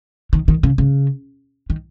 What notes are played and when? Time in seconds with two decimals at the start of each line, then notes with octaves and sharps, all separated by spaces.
0.33 D#3
0.48 D#3
0.63 C#3
0.78 C#3
1.70 D#3